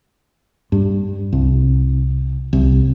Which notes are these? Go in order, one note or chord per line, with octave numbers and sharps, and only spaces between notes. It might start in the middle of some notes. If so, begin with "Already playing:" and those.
G2
C2
C2